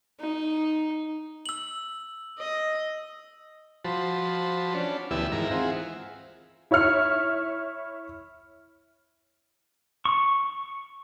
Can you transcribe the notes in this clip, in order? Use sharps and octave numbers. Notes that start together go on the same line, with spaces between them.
D#4
E6 F#7
D#5
F3 F#4 C5 A5 B5
C#4 D4 A5
D2 E3 B3 E4 G4 E6
G#2 D#3 E3 E4 A#4 A#5
C4 F4 G#4 E5 F#5
E4 C#5 E5 F6 C#7
C#6